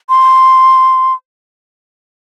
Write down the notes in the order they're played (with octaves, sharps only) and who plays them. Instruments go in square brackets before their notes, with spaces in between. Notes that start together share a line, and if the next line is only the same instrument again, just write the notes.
[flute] C6